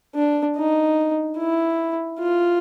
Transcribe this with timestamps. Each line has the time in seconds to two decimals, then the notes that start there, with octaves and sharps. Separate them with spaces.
0.15 D4
0.56 D#4
1.37 E4
2.19 F4